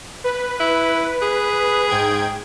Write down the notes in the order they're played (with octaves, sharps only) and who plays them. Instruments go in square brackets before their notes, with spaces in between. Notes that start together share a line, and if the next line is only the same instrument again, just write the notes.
[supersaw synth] B4
[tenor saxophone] E4
G#4
[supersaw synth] G#2 G5 G#6